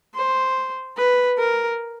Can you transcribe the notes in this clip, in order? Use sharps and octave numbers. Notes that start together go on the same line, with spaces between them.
C5
B4
A#4